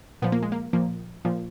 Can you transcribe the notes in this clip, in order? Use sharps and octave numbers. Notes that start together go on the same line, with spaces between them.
A#2 F3 B3
A#3
G#3
A#3
A#2 F3 A#3
A#2 F3